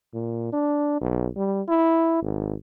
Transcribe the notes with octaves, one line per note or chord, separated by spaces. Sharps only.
A#2
D4
B1
G3
E4
G#1